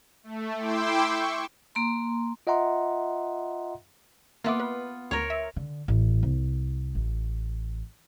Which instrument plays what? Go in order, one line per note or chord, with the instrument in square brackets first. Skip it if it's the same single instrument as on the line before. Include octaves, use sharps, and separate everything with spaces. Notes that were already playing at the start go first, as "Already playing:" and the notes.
[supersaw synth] A3
E4 G5 C6 D6 E6
C#6
[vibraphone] A#3 A#5 C6
[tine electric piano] F4 D#5 E5 F#5 A#5 C6
[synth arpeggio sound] A#3 E5 D6 [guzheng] B3 F4
[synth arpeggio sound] B4
[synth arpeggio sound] D2 [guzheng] A#4 C#5
[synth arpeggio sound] E5
[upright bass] D3
A1
C2
A1